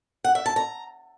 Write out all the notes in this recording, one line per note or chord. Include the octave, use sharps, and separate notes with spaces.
F#5
E5
A5
A#5